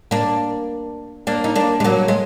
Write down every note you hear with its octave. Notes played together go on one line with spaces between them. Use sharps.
A#3 D4
A#3 D4
D#4
A#3 D4
G#3
F#3 A#3
G#3